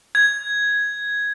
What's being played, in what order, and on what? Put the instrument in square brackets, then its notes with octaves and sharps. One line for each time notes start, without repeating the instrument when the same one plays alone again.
[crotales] G#6